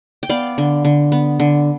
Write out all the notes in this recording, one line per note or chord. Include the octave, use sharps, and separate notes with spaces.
G5
B3 D5 F5
D3
D3
B3
D3